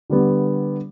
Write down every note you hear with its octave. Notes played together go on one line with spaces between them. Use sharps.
D3 G3 B3